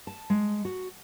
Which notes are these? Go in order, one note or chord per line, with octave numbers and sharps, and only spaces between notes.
A5
G#3
F#4